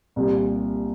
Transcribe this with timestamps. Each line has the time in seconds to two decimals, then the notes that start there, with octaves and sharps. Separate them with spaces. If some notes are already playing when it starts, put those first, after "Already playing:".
0.16 C2 A#2 G3